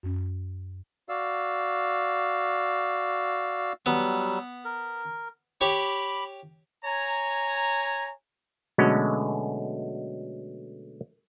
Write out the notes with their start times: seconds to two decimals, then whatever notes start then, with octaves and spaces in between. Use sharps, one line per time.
0.03 F#2 C#4
1.09 F#4 D5 F5 E6
3.86 F#3 G3 B3 E6
4.65 A#4
5.61 G4 C#5 B5 D6
6.85 C#5 G#5 A#5
8.78 B2 D3 F#3 G#3 A3 C#4